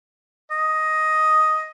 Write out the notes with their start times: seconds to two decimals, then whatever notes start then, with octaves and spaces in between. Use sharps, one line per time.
0.51 D#5